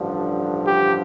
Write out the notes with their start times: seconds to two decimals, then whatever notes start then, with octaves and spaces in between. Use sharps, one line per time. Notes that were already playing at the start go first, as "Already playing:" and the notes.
Already playing: A1 G2 D3 F3
0.67 G4